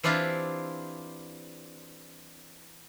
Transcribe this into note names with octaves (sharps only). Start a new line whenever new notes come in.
E3 C4 D4 E4 F4 G4